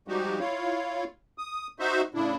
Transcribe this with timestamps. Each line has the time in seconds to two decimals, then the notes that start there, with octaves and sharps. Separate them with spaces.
0.08 F3 G3 G#3 D#4 F#4 G4
0.39 E4 F4 C#5 F5
1.38 D#6
1.79 D#4 F#4 C5 E5
2.14 A2 C#3 D4 E4